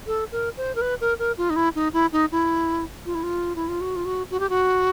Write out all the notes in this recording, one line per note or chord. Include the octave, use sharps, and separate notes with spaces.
A4
A#4
C5
A#4
B4
A#4
A#4
F4
D#4
E4
D#4
E4
D#4
E4
F4
E4
F4
E4
F4
F#4
F4
F#4
F#4
G4
F#4